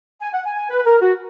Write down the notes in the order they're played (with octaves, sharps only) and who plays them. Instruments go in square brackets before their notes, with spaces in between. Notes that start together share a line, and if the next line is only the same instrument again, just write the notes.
[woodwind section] G#5
F#5
G#5
G#5
B4
A#4
F#4